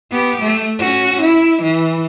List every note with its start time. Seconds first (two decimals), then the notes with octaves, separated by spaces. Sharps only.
0.11 B3 G4
0.40 A3
0.79 C#4 F#4
1.22 E4
1.62 E3